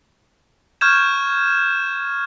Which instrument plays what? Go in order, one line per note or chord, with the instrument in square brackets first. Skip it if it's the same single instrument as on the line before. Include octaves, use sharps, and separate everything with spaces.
[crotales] C#6 F6 G6 G#6 E7